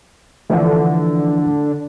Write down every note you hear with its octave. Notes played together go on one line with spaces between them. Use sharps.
D3 E3 F3 A3